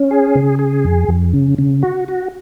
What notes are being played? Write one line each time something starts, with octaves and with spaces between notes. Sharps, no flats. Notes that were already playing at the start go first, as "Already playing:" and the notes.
Already playing: C#4
G#4
C#3
G#4
F2
F2
C#3
C#3
F#4
F#4